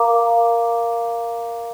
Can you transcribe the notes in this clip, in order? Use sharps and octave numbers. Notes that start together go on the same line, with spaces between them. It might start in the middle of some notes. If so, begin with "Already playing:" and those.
Already playing: A#4 F5 A#5 D6